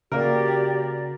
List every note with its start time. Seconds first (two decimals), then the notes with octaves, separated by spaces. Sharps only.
0.12 C#3 A#3 F#4 G4 A#4 D5